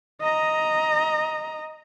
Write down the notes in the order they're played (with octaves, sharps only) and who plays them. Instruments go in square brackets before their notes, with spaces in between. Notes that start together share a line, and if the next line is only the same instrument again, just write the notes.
[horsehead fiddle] D#5 A#5